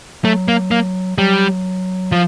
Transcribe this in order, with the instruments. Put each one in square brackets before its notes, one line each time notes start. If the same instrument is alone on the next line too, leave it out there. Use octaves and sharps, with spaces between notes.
[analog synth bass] F#3 [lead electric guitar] A3
[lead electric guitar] A#3
A#3
[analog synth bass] F#3 [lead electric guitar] G3
[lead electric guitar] F3